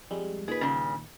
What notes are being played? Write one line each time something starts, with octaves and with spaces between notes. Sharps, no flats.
F2 G3 G#3
A#2 D#3 G#4 B4
G2 C#3